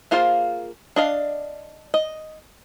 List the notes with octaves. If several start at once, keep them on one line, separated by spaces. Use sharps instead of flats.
A#3 F4 G#4 C5 F5
D4 D#5 F5
D#5